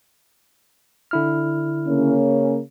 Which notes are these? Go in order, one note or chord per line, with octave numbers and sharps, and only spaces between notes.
D3 E4 F6
C#3 A#3 C#4